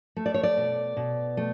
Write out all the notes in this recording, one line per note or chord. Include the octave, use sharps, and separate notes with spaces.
A3
D5
C#5
D5
B2
B2
A3